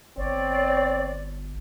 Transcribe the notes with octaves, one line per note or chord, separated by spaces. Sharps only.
G1 C4 C#5 D5